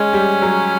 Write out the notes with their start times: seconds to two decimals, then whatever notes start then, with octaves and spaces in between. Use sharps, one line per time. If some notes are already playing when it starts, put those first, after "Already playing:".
Already playing: G#3 C#4
0.13 G3
0.42 F#3